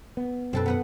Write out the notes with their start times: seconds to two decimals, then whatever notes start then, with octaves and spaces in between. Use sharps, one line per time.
0.17 B3
0.53 F#2 B2 C4 A4 B4
0.66 B3 B4 F#5